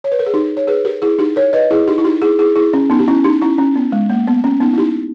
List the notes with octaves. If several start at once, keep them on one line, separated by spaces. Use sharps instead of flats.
C#5
B4
A#4
G#4
D#4 G4
C#5
G#4 B4
G4 A#4
E4 G#4
D#4 G4
A#4 C#5
B4 D#5
E4 G#4
D#4 G4
E4
D#4 G4
E4 G#4
E4 G#4
E4 G#4
C#4
B3 D#4
G4
C#4 E4
D#4 G4
C#4 E4
C#4
B3
G#3
A#3
B3
C#4
B3 D#4
E4
D#4 G4